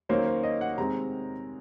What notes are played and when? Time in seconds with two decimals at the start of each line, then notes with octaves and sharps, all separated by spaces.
0.09 D#3 F#3 A#3 C#4 C5
0.26 C5
0.43 D#5
0.61 F#5
0.77 C3 D#3 G#3 C4 A#5